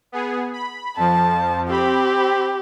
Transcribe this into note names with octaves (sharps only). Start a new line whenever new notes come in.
B3 G#4
B5
F2 F3 A5
C4 G4 B5